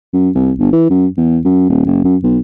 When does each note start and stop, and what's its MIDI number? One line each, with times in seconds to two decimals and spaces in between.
0.14 0.30 42
0.35 0.52 36
0.59 0.70 31
0.73 0.86 52
0.90 1.07 42
1.17 1.39 40
1.45 1.69 42
1.69 1.83 27
1.86 2.03 30
2.04 2.16 42
2.23 2.39 35